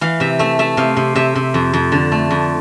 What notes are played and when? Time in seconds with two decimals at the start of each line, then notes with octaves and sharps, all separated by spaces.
0.01 E3 F5
0.20 C3 E5
0.39 A3 E5
0.59 A3 E5
0.77 C3 F5
0.97 C3
1.15 C3 E5
1.35 C3
1.54 F2
1.73 F2
1.92 D3
2.12 A3
2.31 F2